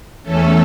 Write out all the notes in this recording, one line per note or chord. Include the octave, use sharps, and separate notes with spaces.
E2 E3 A3 C#4 A4